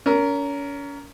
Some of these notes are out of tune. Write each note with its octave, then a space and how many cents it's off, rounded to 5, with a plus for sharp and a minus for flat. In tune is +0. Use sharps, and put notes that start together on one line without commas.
C#4 +35 A#4 +0